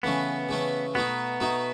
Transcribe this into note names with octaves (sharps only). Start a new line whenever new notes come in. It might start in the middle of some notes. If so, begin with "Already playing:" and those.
C#3 E3 A3 B3 C#4
C#3 E3 A3 C#4
B2 A3 B3 D#4
B2 A3 D#4